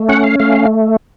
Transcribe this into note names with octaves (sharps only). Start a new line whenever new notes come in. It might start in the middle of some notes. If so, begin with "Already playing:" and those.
Already playing: A3
C#4 F#5
F5
A3 F5